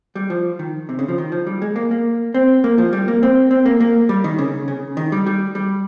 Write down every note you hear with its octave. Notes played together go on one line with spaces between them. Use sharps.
G3
F3
D#3
C3
C#3
F3
D#3
F3
G3
G#3
A#3
A#3
C4
A#3
F3
G3
A#3
C4
C4
A#3
A#3
G3
D#3
C#3
C#3
D#3
G3
G3
G3